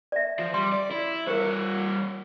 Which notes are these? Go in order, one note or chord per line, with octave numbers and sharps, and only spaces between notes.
D5 E5
F3
G3 C6
D5
E4
G3 A#4 C5 C#5